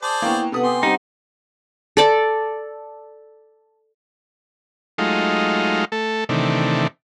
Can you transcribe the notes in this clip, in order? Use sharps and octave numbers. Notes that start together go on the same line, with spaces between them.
G#4 C5 D5 A5
A#3 B3 E4 G5 C#6
C3 B3 A4 B4 F#5 D#6
G4 G#5 C6
G3 C4 D#4 F#5
A4 D5 D6
F#3 G#3 A3 D#4 F4
A3 A4
C3 D#3 E3 A3 D4